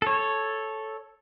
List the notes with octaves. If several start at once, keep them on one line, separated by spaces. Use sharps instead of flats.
A4 C#5